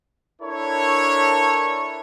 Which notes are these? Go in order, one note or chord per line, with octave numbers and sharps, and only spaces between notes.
D4 E4 A4 A#4 C#5